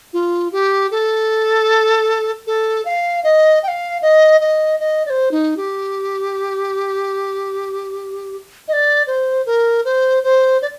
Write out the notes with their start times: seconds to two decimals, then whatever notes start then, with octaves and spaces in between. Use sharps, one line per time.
0.13 F4
0.52 G4
0.91 A4
2.47 A4
2.85 F5
3.24 D#5
3.63 G5
3.68 F5
4.02 D#5
4.41 D#5
4.80 D#5
5.06 D5
5.10 C5
5.31 D#4
5.57 G4
8.68 D#5
8.73 D5
9.07 C5
9.46 A#4
9.85 C5
10.24 C5
10.62 D5